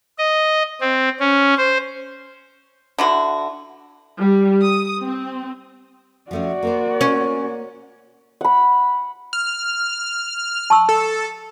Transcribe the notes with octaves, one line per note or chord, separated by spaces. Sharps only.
D#5
C4
C#4
C5
D3 E4 F#4
G3
D#6
C4
F3 A3 C#4 F#4 D5
A#3 A#4 C5
C#4
F#5 B5
F6
A5 C#6 E6
A4